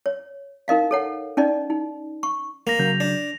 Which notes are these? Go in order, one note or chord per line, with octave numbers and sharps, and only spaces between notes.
C#5
D#4 A#4 D#5 F5
A4 C#5 F#5
C#4 D#4 D5 D#5
D#4
C#6
A#3 A#6 F7
C#3 F#3 G6
D4